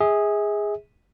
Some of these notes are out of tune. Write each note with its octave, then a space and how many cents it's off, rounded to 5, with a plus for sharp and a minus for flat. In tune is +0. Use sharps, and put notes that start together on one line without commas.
G#4 -10 E5 -40